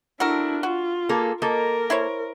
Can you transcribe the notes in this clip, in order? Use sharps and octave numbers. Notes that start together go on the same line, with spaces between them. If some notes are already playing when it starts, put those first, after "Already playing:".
D4 E4 F#4 A4 A#4
F4 F#4
A#3 G#4 A4
A#3 A4 A#4 D#5
E4 C5 C#5